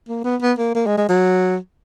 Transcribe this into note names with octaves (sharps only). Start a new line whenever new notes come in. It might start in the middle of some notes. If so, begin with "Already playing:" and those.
A#3
B3
B3
A#3
A#3
G#3
G#3
F#3